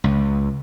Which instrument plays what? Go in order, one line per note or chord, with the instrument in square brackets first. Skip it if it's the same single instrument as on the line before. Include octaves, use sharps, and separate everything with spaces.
[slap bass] C#2